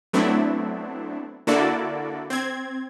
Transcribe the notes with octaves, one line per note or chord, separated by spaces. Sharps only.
F#3 A3 B3 C4 D4 E4
D3 A#3 E4 F#4 A4 D5
C4 G#6